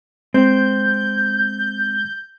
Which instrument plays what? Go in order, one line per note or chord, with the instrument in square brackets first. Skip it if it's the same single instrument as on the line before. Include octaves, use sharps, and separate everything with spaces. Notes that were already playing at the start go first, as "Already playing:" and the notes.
[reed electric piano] G#3 [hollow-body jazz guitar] C4 [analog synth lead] G6